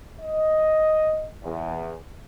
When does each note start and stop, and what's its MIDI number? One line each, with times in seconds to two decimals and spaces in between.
0.21 1.27 75
1.44 1.94 40